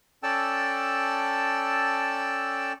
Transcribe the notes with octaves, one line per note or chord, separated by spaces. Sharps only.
C#4 A4 D5 G5 A5 E6